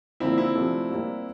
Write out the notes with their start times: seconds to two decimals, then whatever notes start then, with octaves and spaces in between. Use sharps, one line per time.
0.20 D3 F3 A#3 C4 D4 E4
0.38 C4 E4
0.55 C3 F3 A3 D4
0.90 G3 A#3 D4